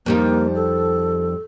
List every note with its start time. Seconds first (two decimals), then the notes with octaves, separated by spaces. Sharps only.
0.06 F2 G3 A#3 D#4
0.55 A4